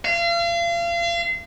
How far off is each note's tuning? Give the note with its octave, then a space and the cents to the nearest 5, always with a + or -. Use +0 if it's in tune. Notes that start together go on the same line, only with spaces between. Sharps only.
F5 -35